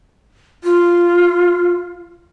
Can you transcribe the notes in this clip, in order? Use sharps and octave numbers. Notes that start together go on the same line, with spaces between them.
F4